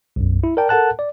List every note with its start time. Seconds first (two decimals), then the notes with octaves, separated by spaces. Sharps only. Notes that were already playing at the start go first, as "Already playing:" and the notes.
0.16 B1 F#2
0.44 E4
0.57 A#4 D5 G5 A5
0.69 A4 A#4 F#5 A5 F#6
0.99 D5